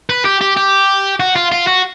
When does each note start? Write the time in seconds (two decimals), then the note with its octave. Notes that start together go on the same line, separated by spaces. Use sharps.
0.09 B4
0.25 G4
0.41 G4
0.57 G4
1.20 F#4
1.36 F4
1.52 F4
1.67 F#4